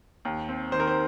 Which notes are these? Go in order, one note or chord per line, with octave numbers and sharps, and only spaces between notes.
D#2
C4
D#3 C5
A#4
C5